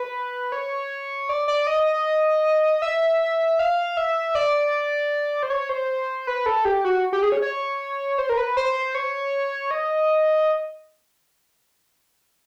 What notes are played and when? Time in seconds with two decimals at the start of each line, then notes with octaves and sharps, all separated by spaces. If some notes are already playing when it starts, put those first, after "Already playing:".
Already playing: B4
0.52 C#5
1.29 D5
1.48 D5
1.67 D#5
2.82 E5
3.59 F5
3.97 E5
4.35 D5
5.43 C5
5.50 C#5
5.69 C5
6.27 B4
6.46 A4
6.65 G4
6.85 F#4
7.13 G4
7.22 G#4
7.32 C#5
7.42 C#5
8.18 C5
8.29 A#4
8.37 B4
8.57 C5
8.95 C#5
9.71 D#5